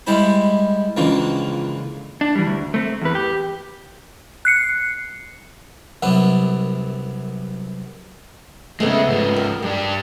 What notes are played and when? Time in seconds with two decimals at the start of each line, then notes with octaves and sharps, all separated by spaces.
0.07 G3 G#3 E4 C5 B5
0.97 C#2 D3 E3 F3 A#3
2.21 D4
2.35 E3 G3
2.46 D2
2.74 A3 C4
3.02 E2 B4
3.15 G4
4.45 F#6 C7 C#7
6.03 C2 F#2 F#3 B3
8.80 C#3 G#3 A3 B3 C4
9.07 G#2 F3
9.36 A#4
9.62 G2 G3 G4